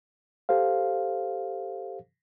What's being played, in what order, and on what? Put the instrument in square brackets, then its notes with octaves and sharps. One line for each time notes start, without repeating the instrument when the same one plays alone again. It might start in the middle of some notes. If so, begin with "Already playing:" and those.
[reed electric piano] G4 A4 C5 F5